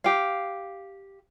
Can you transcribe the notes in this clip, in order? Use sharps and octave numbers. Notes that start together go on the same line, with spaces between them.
G4 F5